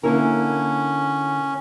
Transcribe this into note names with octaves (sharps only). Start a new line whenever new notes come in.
D3 A#3 C#4 E4 A#4